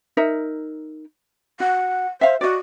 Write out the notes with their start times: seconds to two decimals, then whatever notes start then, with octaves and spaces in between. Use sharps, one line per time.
0.17 D#4 A#4 E5
1.60 F#4 F#5
2.21 C5 E5 F5
2.41 F#4 D5 D#5